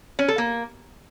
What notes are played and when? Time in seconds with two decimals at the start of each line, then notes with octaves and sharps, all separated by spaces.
0.19 C#4
0.28 A4
0.38 A#3